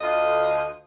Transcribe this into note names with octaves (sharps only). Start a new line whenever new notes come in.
D2 D3 F4 D#5